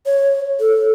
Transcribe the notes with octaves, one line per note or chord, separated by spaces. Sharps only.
C#5
A4